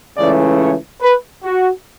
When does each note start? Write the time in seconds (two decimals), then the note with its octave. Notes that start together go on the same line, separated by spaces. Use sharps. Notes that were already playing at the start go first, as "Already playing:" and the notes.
0.17 C#2 C#3 E3 A3 C#4 D5
0.59 C#5
1.01 B4
1.44 F#4